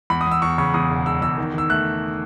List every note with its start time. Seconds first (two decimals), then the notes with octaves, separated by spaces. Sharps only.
0.10 E2 B5
0.21 D#6
0.26 E2 E6
0.42 E2 C#6
0.58 C#3 C#6
0.74 E2 D#6
0.90 E1
1.06 E1 E6
1.22 E2 E6
1.38 D#3
1.54 D#3 E6
1.70 A3 F#6